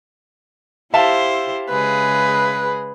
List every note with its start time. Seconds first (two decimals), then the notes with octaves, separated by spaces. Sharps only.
0.94 E4 G4 C5 E5 F5 A5
1.70 C#3 G#3 G#4 B4